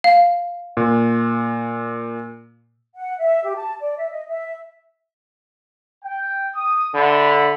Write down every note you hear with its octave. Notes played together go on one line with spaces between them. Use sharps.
F5
A#2
F#5
E5
G4
A5
D5
E5
D#5
E5
G5
D#6
D3 E5 B5